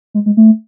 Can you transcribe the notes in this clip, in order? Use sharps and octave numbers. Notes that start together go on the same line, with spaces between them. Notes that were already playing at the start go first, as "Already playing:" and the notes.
G#3
G#3
A3